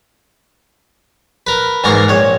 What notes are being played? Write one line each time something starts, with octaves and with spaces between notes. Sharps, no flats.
A#4 B4
E2 G#2 A#3 A#4 C#6
A#1 C#5